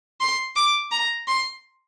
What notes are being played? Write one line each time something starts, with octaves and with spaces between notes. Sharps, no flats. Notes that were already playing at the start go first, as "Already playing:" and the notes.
C6
D6
A#5
C6